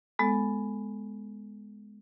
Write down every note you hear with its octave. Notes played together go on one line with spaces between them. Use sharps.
G#3 B3 A4